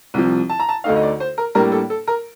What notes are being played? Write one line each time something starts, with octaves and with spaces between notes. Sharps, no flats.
C2 C3 F3
A5
A#5
A5
D2 D3 A3 D#4 F5
D#5
D5
C5
A#4
A2 G3 A#3 D4 A#4
A4
A4
A#4